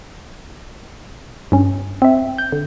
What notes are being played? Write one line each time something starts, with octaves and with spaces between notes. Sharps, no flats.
G2 C#4
C4 E5
G6
D3